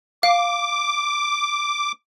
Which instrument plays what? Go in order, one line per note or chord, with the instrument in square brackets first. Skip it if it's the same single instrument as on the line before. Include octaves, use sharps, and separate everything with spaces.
[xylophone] F5 [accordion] D6